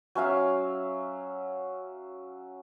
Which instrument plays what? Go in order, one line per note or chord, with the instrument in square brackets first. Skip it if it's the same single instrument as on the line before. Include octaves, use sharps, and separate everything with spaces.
[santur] F#3 C#4 E5 F5